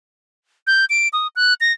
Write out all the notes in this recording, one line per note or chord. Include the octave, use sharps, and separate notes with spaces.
G6
D7
D#6
F#6
A#6